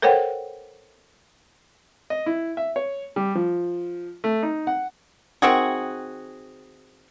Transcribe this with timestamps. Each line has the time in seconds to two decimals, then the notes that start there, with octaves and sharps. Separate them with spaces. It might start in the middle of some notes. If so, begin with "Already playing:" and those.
0.02 A4 A#4 C5 C#5 F#5 G5
2.10 D#5
2.26 E4
2.57 E5
2.76 C#5
3.16 G3
3.35 F3
4.24 A3
4.43 D#4
4.67 F#5
5.42 D#3 C4 F#4 G#4